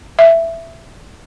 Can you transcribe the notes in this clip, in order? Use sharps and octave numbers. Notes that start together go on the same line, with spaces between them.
E5